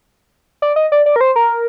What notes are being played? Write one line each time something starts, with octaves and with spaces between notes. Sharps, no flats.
D5
D#5
D5
D5
A#4
C5
A#4